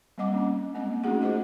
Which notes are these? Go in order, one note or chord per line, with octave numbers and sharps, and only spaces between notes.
G3 A#3 C4 D#5 F#5 D6
C#4 D4 D#5
G#3 A#3 C4 D#5
A3 C#4 D#4 F#4 G#4 F#5
F4 G#4 C5 D#5 F#5